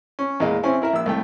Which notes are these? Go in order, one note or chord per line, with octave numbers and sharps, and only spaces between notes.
C#4
E2 A#2 G#3 D#5 F5
C4 C#4 E4 G#5
E4 A#4 E5
A#1 E6
C2 A3 G5